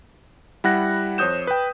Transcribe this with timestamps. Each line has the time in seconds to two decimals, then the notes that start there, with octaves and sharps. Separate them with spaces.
0.64 G3 E4 F#5 F#6 A#6
1.18 F2 C5 C#5 D#6 G6 E7
1.47 B4 G5